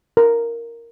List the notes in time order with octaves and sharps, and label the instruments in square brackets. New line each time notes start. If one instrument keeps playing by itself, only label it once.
[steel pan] A#4